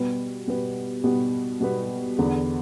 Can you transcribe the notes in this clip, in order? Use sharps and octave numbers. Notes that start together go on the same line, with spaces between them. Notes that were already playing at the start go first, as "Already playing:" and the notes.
Already playing: B2 G3 B3 G4 B4
B2 G3 B3 G4 B4
B2 G3 B3 G4 B4
B2 G3 B3 G4 B4
E2 D3 B3